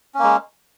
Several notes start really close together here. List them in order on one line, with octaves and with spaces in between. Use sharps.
C#4 A#3 G#3